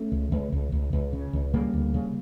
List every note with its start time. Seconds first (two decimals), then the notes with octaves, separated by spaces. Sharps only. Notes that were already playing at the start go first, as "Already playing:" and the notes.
Already playing: A3 C#4
0.12 C#2
0.32 C#2
0.52 C#2
0.72 C#2
0.93 C#2
1.13 C#3
1.33 C#2
1.54 C#3 G3 A#3
1.74 D2
1.94 C#3